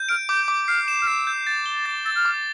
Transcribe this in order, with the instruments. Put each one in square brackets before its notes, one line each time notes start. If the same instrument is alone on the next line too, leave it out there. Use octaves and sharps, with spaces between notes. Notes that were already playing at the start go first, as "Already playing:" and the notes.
Already playing: [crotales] G6
[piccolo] F6 [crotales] D7
[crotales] D6 [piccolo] G6
[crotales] D6
[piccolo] F6 [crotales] C7
[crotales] E7
[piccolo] F6
[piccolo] E6 [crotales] C7
[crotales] G6
A6
G7
[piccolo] D6 [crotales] A6
[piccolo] E6 [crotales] A6
[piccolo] F6
[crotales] D6